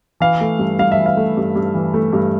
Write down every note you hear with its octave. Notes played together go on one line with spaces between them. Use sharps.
E3 F5
A3
G2
G2 F5
E5
E3
F5
A3
G2
G2
E3
A3
G2